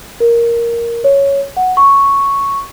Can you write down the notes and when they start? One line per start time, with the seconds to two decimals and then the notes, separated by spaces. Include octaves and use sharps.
0.20 A#4
1.04 C#5
1.57 F#5
1.77 C#6